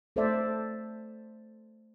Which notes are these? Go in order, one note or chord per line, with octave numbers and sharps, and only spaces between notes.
A3 A4 C5 D5 E5